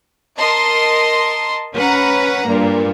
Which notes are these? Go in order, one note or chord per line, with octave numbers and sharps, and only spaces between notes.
A#4 D#5 A5 C6
C#4 B4 F#5 A#5
G2 A#2 A#3